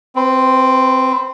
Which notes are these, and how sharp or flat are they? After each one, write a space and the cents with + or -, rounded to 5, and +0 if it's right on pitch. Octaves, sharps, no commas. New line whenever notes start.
C4 +0 B4 +30